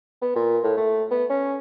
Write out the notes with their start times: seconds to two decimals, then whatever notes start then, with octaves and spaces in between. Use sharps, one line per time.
0.22 B3
0.36 A#2
0.64 A2
0.77 A3
1.11 B3
1.30 C#4